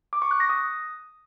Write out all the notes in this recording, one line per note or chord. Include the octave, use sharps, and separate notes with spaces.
D6
C#6
F#6
A#6
D#6